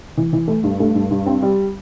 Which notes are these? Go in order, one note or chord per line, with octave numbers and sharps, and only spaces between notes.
E3
E3
A3
G2
A3
G2
G2
C4
G3